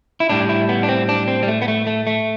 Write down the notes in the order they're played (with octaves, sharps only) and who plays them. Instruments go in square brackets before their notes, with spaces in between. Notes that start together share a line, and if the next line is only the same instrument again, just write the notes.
[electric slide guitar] E4
A2 G3 D4
E4
B3
D4
C4
D4
C4
G3
A3
B3
A3
A3
A3